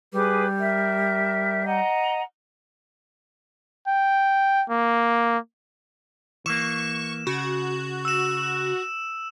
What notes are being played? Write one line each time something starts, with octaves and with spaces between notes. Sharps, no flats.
G3 G#4 B4 D6
A#4 E5
D#5 F#5 A#5
G5
A#3
E3 A#3 C#6 E7
C#3 F#4
E6 E7